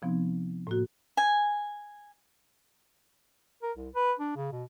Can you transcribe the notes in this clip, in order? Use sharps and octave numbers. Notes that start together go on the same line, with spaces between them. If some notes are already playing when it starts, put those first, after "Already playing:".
C3 F3 B3 C4 D#4
A2 A#3 F#4
G#5
A#4
C2
B4
D4
C#3
B2